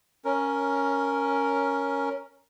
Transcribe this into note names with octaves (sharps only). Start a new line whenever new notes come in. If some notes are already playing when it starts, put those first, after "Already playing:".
C#4 A#4